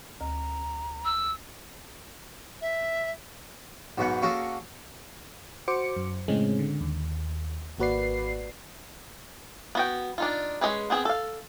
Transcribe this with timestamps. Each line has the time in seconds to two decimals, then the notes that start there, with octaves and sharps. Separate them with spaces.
0.21 D2 A#5
1.05 E6
2.62 E5
3.98 B1 G#2 B2 B3 F#5
4.22 A#3 C#4 F#4 G#4 A4
5.68 F#4 C5 D6 C#7
5.96 F#2
6.28 A2 C#3 G#3 C4 C#4
6.59 D3
6.81 D#2
7.78 G#1 A#3 F#4 B4 D5 C7
9.75 B3 F#4 G5
10.18 D4 D#4 F4
10.61 G#3 C#4 G#4 B4
10.90 B3 C4 G#4
11.05 A4 F5